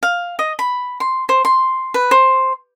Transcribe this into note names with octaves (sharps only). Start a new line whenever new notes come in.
F5
D#5
B5
C6
C5
C6
B4
C5